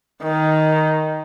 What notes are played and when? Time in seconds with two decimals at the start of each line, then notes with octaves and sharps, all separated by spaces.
0.24 D#3